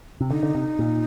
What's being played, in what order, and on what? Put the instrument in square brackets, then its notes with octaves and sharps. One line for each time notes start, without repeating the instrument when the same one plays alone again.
[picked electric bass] C3
[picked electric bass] D3 [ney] D#4
[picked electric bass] D3
C3
A#2